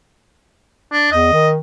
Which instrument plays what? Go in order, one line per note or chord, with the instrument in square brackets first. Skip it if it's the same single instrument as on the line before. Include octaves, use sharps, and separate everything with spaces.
[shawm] D4
[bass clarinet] E2 [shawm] D#5
[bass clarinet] D#3